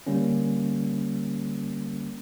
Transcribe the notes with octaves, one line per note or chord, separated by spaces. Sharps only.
D3 G3 A#3 C#4